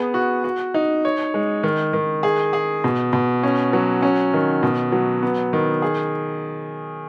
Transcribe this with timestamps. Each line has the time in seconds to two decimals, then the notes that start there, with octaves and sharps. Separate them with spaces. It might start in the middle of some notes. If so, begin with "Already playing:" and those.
Already playing: B3 G#4
0.14 F#4
0.44 F#4
0.74 D#4
1.05 C#5
1.34 G#3
1.63 D#3
1.93 D#3
2.23 G#4
2.53 G#4
2.84 B2
3.13 B2
3.43 C#4
3.73 F#3
4.02 C#4
4.34 D#3
4.63 B2
4.92 F#3
5.23 B3
5.53 D#3
5.82 G#4